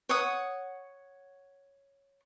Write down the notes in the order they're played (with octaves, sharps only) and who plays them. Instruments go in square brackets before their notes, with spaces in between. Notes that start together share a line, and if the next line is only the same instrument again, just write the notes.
[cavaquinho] C#5 F#5 D#6